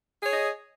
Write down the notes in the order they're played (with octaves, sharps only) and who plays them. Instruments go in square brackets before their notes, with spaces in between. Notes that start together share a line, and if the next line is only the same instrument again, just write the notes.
[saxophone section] G#4
C#5
D#5